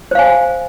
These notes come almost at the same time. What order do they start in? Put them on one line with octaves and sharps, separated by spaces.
C5 F5 G#5